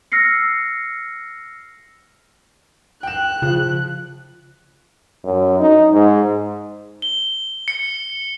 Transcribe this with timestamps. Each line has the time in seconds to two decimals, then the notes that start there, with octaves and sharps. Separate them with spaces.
0.12 E6 F6 A#6 C7 C#7
3.03 G5 F#6 E7
3.42 C#3 F3
5.24 F#2
5.60 D#4
5.92 G#2
7.02 G7
7.68 C#7